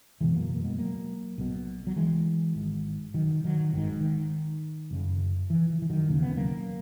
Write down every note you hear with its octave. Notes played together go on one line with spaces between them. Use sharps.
F#1 E2 B2 E3 G#3
F#3 A#3
A#3
G#3 B3
F#3 A#3
B1 B2
F#3
E3 G#3
G#1 G#2
D#3 F#3
D#3 F#3
G#1 G#2 D#3
D#3
F#1 F#2 C#3
E3
E3
E3
D#3 F#3
E1 D#2 C#3 A#3
B3
F#3 A#3